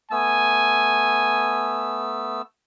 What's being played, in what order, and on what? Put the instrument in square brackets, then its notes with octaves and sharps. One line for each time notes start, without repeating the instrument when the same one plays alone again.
[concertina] A3 B3 E6 [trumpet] G#5